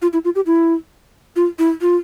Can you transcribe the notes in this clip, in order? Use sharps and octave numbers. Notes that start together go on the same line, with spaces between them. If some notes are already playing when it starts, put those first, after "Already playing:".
F4
E4
F4
G4
E4
F4
E4
F4